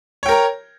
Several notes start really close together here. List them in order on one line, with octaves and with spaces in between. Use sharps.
C#5 G5 A#4 A#5